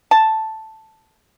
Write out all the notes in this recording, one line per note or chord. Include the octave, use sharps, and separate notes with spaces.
A5